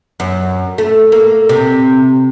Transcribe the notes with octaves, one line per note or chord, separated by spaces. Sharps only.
F#2
A3
A#3
C3